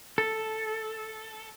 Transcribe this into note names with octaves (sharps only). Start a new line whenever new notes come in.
A4